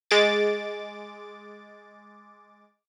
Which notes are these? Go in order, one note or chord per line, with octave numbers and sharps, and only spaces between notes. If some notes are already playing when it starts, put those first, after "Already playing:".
G#3 D6 A6